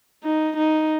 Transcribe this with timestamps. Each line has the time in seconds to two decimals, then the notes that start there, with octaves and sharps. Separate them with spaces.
0.24 D#4
0.57 D#4